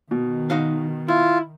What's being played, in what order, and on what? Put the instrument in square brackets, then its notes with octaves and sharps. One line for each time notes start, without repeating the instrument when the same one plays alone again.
[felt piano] B2 [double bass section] D#3
[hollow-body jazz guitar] D#4 F#4 F5
[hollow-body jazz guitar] E4 [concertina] F4